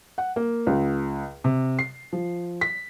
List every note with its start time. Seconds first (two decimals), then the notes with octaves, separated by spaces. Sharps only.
0.18 F#5
0.36 A#3
0.67 C#2
1.44 C3
1.79 C7
2.13 F3
2.61 B6